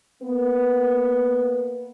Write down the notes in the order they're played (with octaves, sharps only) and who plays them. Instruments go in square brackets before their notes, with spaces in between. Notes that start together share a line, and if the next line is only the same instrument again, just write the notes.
[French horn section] A#3 B3 B4